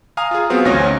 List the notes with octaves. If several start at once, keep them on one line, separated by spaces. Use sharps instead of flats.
F5 G#5 A#5 D#6 F6
F4 G#4
F#3 B3 C4 F4 F#4 G#4
A1 D2 C#4 D#4 C#5 A#6